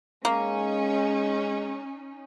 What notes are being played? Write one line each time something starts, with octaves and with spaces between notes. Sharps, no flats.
G#3 A#3 C#4 D#4